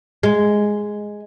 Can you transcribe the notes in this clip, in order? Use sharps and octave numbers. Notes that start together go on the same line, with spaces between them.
G#3